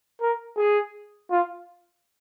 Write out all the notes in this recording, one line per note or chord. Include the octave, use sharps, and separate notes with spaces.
A#4
G#4
F4